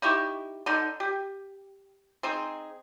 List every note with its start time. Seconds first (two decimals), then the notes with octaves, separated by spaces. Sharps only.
0.02 D#4 E4 G4 C#6
0.66 D3 D#4
1.00 G4
2.23 C4 D#4 G#4